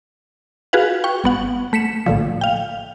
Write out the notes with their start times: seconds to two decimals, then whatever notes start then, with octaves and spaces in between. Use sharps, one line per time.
0.73 F4 F#4 G#4 B4 F5 F#5
1.04 G5 C#6
1.24 G1 B3 F#5
1.73 A3 B6 C#7 E7
2.06 A#1 A2 D3 F3
2.41 F5 G5